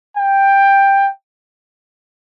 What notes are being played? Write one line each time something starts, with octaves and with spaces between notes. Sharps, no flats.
G5